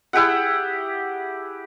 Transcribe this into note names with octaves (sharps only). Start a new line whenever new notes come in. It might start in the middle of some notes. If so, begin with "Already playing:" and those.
E4 G4 G#4 F#5